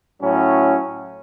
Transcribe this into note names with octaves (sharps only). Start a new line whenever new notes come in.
A2 F#3 C#4